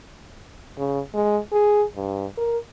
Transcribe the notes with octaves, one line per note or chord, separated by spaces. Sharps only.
C#3
G#3
G#4
G2
A#4